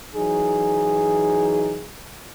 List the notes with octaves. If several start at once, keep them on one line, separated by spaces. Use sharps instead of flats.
E3 F#3 D#4 G#4